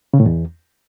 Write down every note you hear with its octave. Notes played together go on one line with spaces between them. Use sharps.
C#3
A2
E2